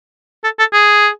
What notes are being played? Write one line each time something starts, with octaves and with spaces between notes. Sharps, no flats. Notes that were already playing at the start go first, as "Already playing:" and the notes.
A4
A4
G#4